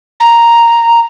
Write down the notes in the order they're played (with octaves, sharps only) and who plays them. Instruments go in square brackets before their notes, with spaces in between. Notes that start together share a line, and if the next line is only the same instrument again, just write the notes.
[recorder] A#5